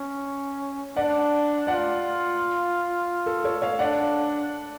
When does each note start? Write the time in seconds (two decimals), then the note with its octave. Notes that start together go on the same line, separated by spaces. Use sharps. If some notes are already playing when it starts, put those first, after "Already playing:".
Already playing: C#4
0.97 D4 D5 F#5
1.67 F4 D5 F#5
3.26 A4
3.44 A4 C#5
3.62 C#5 F5
3.79 D4 D5 F#5